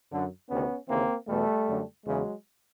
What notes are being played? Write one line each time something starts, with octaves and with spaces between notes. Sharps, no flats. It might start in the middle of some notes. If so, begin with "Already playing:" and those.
F#2 D3
D2 C3 D#3 B3 C#4
D#2 C#3 E3 A#3 C4
E2 B2 G3 A3
F#2 D3
E2 C#3 E3 F#3 G#3